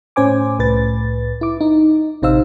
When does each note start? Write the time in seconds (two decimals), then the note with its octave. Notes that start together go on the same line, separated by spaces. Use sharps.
0.16 A2 C#4 C5 G#5 D6
0.59 C2 A2 B4 A6
1.41 E4 D6
1.61 D#4
2.22 A1 C3 D#4 C5 F5 E6